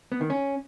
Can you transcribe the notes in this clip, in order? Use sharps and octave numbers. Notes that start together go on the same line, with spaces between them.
B3
D#3
C#4